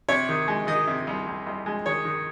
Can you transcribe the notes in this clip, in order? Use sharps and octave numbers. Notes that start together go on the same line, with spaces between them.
C3 C#5
D#3
G#3
D#3 D#5
C3
C2
C2
C2
G#3
D#3 C#5
D#3